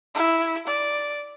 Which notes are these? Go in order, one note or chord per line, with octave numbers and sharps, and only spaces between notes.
E4
D5